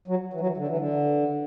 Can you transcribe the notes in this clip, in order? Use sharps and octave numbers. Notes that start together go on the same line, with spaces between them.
F#3
E3
F#3
E3
D3
E3
D3